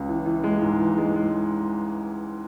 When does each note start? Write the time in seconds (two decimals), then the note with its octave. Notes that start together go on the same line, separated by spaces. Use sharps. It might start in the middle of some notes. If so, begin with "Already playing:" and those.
Already playing: C#2
0.09 E3
0.26 E3
0.44 G#3
0.62 G#2
0.80 E3
0.98 G#3
1.16 G#3